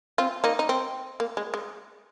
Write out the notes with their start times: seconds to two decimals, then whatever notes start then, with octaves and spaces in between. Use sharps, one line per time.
0.18 C4 F4
0.44 A#3 D#4
0.59 D#4
0.69 C4
1.20 A#3
1.37 G#3
1.54 G#3